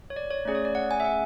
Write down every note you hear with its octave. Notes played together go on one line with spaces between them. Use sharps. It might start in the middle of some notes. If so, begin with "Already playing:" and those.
C#5
D5
C#5
A3 C#4 G#4 D5
C#5
D5
F#5
G#5
E5
F#5